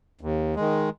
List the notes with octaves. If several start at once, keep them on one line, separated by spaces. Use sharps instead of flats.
D#2
D#3 G#3